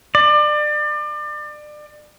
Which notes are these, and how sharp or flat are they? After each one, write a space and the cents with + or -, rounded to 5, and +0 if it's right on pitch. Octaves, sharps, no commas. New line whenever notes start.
D5 +30